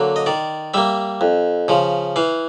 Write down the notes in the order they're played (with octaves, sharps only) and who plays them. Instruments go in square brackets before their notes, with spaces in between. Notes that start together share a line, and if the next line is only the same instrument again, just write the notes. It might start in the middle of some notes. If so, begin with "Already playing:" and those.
Already playing: [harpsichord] D3 F#3 A#3
D#5
D#3 D5
G3 A#3 E5
F2
C#3 F3
E3 F5